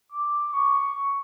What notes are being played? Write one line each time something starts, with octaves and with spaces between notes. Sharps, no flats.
D6
C#6